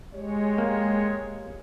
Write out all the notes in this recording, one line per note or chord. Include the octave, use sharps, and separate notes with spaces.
G#3 G4 C#5
A#3